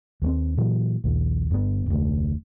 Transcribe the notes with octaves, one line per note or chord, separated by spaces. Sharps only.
D#2 A3 C4
A#2 E3 F#3
A#1 D#2
G1 G2 B2 B3
F1 D2